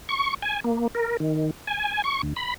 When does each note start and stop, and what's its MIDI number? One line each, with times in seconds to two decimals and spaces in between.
0.09 0.34 85
0.42 0.60 80
0.64 0.87 58
0.95 1.17 70
1.20 1.51 51
1.67 2.02 80
2.04 2.21 85
2.22 2.34 38
2.36 2.54 83